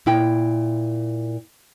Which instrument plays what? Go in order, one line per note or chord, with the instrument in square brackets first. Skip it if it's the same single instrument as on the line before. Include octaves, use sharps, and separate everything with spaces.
[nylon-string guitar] A#2 E4 G5